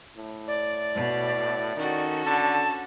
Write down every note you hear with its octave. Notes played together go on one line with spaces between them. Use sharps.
A2
D5
B2
D#3 C#4 F#4 A4
D3 A5